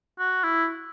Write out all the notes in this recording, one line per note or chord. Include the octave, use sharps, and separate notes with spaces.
F#4
E4